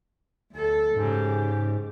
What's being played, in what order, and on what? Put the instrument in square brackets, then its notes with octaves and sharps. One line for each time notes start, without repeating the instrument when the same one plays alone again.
[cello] D2 A4
[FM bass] G#2 [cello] C#3 G4